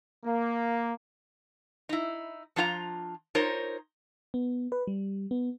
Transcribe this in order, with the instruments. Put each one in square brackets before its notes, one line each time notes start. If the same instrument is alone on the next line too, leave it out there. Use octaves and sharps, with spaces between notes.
[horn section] A#3
[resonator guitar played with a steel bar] D#4 E4
F3 D4 F4 F5 A#5
D#4 F4 A#4 C5 C#5
[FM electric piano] B3
B4
G3
B3